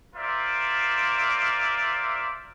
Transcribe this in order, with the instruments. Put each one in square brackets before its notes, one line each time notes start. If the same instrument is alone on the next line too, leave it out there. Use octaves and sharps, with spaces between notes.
[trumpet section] F4 A#4 C5 D5 E5